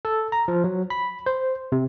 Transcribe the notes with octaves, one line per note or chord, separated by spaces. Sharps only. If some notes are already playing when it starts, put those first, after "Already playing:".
A4
A#5
F3
F#3
B5
C5
C3